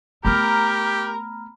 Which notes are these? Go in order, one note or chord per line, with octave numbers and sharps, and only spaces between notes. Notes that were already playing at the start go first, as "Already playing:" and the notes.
A3 B3 G4 A#4 A#5 B5 F6